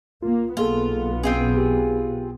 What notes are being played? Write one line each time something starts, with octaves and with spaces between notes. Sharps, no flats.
C2 A#3 F4
B1 A#3 B3 F4 G#4 A4
C4 C#4 F4 G#4
G4